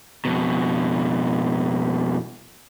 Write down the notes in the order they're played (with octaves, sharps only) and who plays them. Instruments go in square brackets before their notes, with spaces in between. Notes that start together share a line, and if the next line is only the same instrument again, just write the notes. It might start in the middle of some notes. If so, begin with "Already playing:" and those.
[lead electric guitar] F2 B2